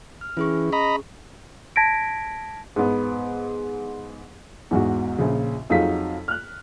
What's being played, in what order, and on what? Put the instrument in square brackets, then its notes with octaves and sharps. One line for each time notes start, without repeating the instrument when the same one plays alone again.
[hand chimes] F6
[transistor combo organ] E3 [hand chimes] C#4 G#4 C#6
[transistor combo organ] D#5 A#5 B5
[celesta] A5 G#6 A#6 B6 D7
[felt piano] G#2 B3
[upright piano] E2 G#2 F#4
A#1 A#2 C#3
F2 F#3 D#4 F4 G#4 B6
F6 F#6